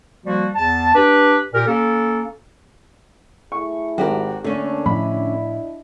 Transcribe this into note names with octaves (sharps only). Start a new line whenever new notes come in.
F3 G3 A#3 F#4
E2 A5
D4 G4 B4
A#2 G4 A#4
A#3 C#4 A4
A3 E4 G#4 C#6
G#1 F#4 G4 A#4
D3 A3 A#3 C#4 D4 C#5
A2 F3 A3 D4 E4 D#5 B5